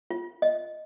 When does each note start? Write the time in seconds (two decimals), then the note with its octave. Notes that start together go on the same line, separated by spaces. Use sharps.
0.10 F4
0.42 D#5